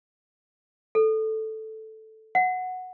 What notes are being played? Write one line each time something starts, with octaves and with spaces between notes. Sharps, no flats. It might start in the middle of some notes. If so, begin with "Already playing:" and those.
A4
F#5